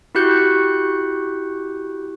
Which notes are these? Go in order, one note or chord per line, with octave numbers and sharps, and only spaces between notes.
E4 F#4 G4 F#6 G6 C#7